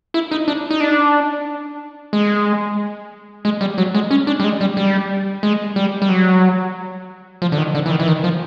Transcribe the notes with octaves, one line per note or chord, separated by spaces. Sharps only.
E4
D#4
D4
D#4
D4
G#3
G#3
G3
F#3
G#3
C#4
D4
G3
G#3
G3
G3
G#3
G3
G3
F#3
F3
D3
D#3
D3
E3
D#3
E3
D#3
F3